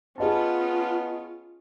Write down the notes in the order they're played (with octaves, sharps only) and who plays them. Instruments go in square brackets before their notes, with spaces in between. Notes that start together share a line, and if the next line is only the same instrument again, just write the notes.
[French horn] B3 [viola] C#4 F4 [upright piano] G#4 D#5 A5